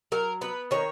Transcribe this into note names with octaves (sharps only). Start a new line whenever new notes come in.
F#3 A#4
B3 B4
D#3 C#5